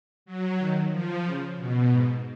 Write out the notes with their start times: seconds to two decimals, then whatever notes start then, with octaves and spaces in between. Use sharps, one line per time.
0.26 F#3
0.59 D#3
0.91 F3
1.24 C#3
1.57 B2
1.90 G#2